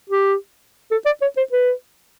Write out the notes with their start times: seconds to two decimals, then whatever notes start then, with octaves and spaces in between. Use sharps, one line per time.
0.10 G4
0.91 A4
1.06 D5
1.22 C#5
1.37 C5
1.52 B4